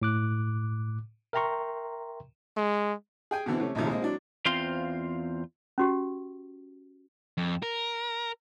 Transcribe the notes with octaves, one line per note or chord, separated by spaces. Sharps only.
A2 D6 F#6
A#4 E5 G5 A#5 C6 C#6
G#3
G#4 G5 G#5
B2 D3 E3 B3 C4
C3 A3 C#4
A#1 A2 C3 D#3 F3
G#3 A#3 C4 D#5
F#3 D4
E2 C4 F4 C5 F5 C6
C#4 F#4 G4
F2
A#4